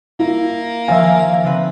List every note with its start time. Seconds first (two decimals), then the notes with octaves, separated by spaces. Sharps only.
0.19 A#3 E4
0.88 D#3 F3 E5 F5 G#5
1.44 D3 C4 B4